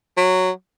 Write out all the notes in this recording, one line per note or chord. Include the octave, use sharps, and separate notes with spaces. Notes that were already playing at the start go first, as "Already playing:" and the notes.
F#3